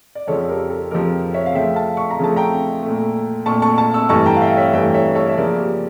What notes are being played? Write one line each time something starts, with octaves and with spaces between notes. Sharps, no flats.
D5
F2 C#3 F3 A4 C#5
G4 A#4
A4
F2 C#3 F3 G4 A#4
C#5 E5
F5
C#3 F3 A3 E5 G5
F5 A5
C#6
A#5
C#3 F3 A3 A5
G5 A#5
A#2 A3
A#2 A3 A5 C#6
A5 C#6
A5 C#6
C#6 E6
G2 E3 A3 A5 C#6
G5 A#5
F5
E5 G5
C#5 E5
G2 E3 A3 E5 G5
C#5 E5
A4 C#5
E5
C#3 F3 A#3 A#4 D5
G4